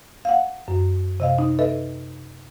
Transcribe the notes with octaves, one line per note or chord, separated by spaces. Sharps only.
F5 F#5
F#2
C3 D#5 F5
D#4
A4 B4 D#5 E5